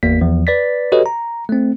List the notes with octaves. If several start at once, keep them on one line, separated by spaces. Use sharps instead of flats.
G#1 E2 A#3 B6
E2 F3
B4 D5 A6 B6
F#4 G4 A4 B4 C#5 D#5
A#5
A3 C4